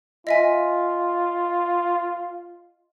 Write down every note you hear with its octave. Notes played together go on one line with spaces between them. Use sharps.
F4 D#5 E5 G#5